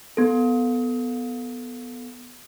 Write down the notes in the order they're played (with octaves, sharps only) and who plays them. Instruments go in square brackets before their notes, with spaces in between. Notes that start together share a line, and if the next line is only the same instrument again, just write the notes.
[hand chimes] B3 A4